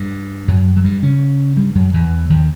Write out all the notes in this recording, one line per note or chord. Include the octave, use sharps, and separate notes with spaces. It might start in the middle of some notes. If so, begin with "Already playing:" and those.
Already playing: G2 G3
F#2 F#3
F#3
G2 G3
C#3 C#4
G2 G3
F#2 F#3
E2 E3
D#2 D#3